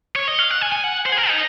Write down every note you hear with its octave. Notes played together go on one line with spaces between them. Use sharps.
C#5
D#5
F5
F#5
G#5
G#5
F#5
C5
G#4
A#4
D#4